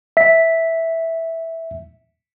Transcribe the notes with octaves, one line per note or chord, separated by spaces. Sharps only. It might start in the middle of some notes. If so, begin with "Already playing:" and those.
E5 B6